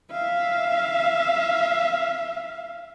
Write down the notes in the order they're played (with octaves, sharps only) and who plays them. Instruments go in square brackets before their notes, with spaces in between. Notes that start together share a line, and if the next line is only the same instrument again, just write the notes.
[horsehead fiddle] E5 F5